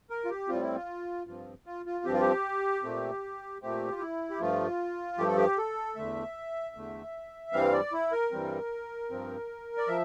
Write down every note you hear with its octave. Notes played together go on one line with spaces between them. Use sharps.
A#4
F4
G4
A2 G3 C4 F4
E4
F4
G2 F3 C4 F4
F4
F4
G2 F3 C4 G4
F4
G4
A#2 A3 C4
A#2 A3 C4 G4
F4
E4
G4
G2 F3 A3 F4
G2 F3 A3 G4
A4
G4
A4
E2 D3 A3 E5
E2 D3 A3
G2 E3 G3 C4 F5
D5
E4
A#4
G2 E3 G3 C4
G2 F3 C4
D5
F3 E5